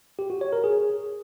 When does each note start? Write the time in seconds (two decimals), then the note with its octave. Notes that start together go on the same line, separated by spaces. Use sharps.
0.19 G4
0.30 F#4
0.41 C#5
0.53 A#4
0.64 G#4